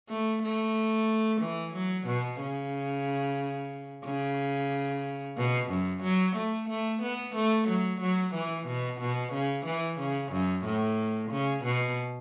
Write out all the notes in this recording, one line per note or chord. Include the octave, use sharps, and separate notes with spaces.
A3
A3
E3
F#3
B2
C#3
C#3
B2
F#2
F#3
A3
A3
B3
A3
F#3
F#3
E3
B2
B2
C#3
E3
C#3
F#2
A2
C#3
B2